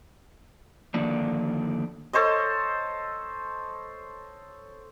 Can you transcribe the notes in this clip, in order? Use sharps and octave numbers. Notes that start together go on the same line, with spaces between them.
D3 D#3 F3 A#3 D4
A4 C5 C#5 D#5